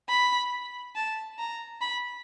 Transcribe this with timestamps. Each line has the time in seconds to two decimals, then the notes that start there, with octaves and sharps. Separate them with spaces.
0.09 B5
0.95 A5
1.38 A#5
1.81 B5